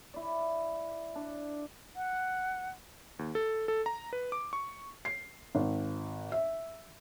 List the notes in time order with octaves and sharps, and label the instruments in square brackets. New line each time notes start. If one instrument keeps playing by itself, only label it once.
[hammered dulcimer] E4 D5
D4
[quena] F#5
[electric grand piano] D#2
A4
A4
A#5
B4
D6
C#6
[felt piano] C7
G#1
E5